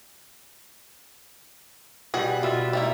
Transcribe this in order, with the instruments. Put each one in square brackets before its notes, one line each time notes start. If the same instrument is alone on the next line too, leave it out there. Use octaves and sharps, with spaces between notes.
[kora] B2 G3 [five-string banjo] F#4 G#4 F#5
[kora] B2 E5 [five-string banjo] F4
[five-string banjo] G3 A#3 E4